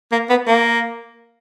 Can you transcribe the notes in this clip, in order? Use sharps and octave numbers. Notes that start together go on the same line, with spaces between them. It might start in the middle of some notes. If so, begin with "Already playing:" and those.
A#3
B3
A#3